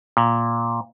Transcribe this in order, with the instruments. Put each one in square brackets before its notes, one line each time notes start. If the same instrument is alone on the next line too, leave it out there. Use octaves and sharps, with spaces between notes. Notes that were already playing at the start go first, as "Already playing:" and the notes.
[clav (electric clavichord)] A#2